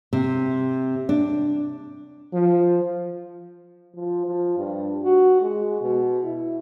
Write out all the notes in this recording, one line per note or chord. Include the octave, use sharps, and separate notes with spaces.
C3
D4
F3
F3
F3
G2
F#4
G#3
B2
E4